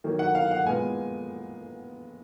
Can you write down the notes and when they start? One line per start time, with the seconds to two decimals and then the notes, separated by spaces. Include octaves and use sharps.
0.04 D#3 F#3 A#3
0.19 F#5
0.35 F5
0.51 F#5
0.65 A#2 G#3 B3 G#5